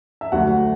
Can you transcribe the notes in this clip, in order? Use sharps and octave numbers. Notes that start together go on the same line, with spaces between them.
E5
D2 D3 F#3 A3 F#4 F#5